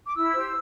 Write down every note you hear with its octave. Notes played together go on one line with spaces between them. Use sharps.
D6
E4 E6
G4 C5